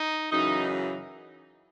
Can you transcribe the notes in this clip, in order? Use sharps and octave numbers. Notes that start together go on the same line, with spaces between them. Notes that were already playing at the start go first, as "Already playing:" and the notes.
Already playing: D#4
F#2 C#3 E3 D#4